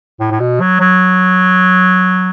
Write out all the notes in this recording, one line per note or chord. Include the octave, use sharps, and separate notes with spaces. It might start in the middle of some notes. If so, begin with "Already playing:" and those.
A2
A2
B2
F#3
F#3